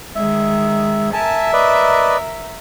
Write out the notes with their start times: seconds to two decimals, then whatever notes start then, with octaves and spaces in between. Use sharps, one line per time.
0.15 D#3 G#3 E5
1.13 A#4 E5 G#5 A5
1.53 B4 D5 D#5